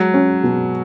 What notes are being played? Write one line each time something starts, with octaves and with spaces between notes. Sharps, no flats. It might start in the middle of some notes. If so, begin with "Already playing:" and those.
Already playing: F#3 G#3
C#4
B2